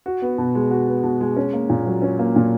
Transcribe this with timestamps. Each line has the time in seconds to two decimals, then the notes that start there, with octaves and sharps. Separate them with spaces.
0.06 F#4
0.22 B3
0.38 B2
0.55 G#3
0.71 F#4
0.87 B3
1.03 B2
1.21 G#3
1.37 C#4
1.53 A#3
1.69 A#2
1.86 F#3
2.02 C#4
2.19 A#3
2.36 A#2